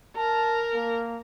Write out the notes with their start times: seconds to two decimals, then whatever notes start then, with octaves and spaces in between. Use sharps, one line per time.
0.16 A#4 A5
0.74 A#3